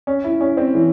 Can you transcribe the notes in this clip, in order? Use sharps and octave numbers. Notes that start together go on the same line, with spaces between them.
C#4
E4
C#4
C4
E3